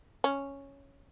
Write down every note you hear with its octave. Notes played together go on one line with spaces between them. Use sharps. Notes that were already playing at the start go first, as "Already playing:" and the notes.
C#4